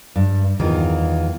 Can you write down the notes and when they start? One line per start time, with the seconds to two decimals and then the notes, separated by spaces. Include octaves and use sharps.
0.16 G2
0.59 E2 D#3 E3 F4